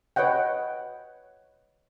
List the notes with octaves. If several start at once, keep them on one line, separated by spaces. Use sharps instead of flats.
B4 C#5 D#5 F#5 G5